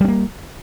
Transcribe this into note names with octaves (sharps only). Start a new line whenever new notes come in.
G3 A#3 C#4